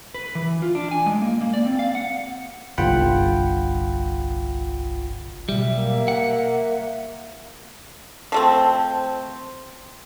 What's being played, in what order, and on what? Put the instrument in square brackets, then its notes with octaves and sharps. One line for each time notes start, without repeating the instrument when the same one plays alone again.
[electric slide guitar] B4
E3
F4
D4
G#5
G#3
A#3
A#3
D5
C4
F5
F#5
[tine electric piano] G1 C2 F4 F#5 G5 B5
[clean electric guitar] B1 G3 [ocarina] E5
[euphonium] A#3
[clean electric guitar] F#5
[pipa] F3 A3 C4